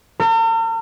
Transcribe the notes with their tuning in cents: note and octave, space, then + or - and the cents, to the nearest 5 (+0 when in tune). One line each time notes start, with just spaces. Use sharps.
A#4 -45